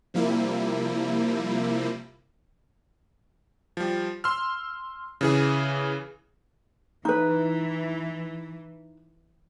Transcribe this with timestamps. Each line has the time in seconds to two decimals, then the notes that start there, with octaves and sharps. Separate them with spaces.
0.14 C3 F3 G3 A#3 E4
3.77 F3 G3
4.24 C6 E6 F6
5.21 C#3 E3 G#4
7.05 E3 D#4 B4